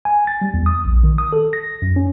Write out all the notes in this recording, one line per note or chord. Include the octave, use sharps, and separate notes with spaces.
G#5
A6
G3
E2
D#6
A#1
D#3
D#6
A4
A#6
F#2
C#4